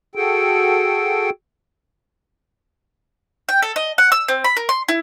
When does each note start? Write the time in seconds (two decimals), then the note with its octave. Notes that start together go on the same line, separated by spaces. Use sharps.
0.15 F#4 G#4 A4 G5
3.49 G5
3.62 A4
3.76 D#5
3.98 F#5
4.12 E6
4.28 C4
4.44 B5
4.57 A#4
4.69 C6
4.88 E4